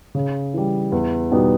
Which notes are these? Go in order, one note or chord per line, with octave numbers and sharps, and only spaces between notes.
C#3
E3 G3
E2
B2 G3 B3 D#4